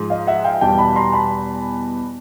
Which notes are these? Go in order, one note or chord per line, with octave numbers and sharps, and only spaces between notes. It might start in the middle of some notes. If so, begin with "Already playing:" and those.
Already playing: G#2 F3 G#3
D#5 F5
E5 F#5
F5 G5
E2 B2 G3 B3 G5 A5
A5 B5
A#5 C6
A5 B5